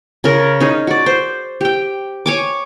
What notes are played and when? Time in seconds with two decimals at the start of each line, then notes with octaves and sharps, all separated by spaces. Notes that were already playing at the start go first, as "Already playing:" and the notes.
0.24 C#3 A#4
0.60 C#4 D#4 G#4
0.87 F#4 D5
1.06 C5
1.61 G4 G5
2.26 C#5 G#5 D6